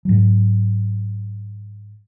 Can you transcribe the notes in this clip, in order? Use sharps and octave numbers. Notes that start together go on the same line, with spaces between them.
G#2 F#3